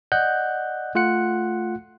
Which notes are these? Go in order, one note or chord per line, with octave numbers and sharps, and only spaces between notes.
D5 D#5 F#5 F#6 G6
A3 F4 F#5 F#6 C#7